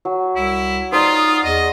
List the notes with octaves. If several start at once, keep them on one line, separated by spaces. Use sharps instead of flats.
F#3
C2 E4
D#4 F4 C5 D5 D#6
E2 D#5